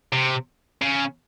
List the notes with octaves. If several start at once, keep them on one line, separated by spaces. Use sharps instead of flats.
C3
C#3